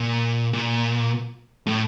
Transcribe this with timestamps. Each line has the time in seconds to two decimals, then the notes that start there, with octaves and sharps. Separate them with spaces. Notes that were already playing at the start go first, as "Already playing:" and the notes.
Already playing: A#2
0.53 A#2
1.66 A2